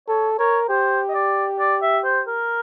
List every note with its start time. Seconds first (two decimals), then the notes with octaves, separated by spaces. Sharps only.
0.08 A4 C#5
0.39 A#4 C#5
0.68 G4 C5
1.09 D#5
1.14 D5
1.59 D5
1.82 E5
2.04 C5
2.27 A#4